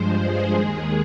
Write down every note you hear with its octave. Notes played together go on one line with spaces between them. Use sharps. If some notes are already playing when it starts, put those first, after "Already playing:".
Already playing: G2 F3 G#3 C5
G#4
D#2 D#3 G#3